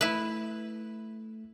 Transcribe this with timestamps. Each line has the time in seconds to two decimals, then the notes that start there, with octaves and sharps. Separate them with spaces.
0.01 A3 E4 B4